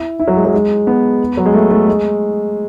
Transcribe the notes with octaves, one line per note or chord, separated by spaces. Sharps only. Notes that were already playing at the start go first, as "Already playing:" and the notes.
Already playing: E4
E4
F#3
G#3
F#3
G#3
B3
F#3
G#3
A3
A3
G#3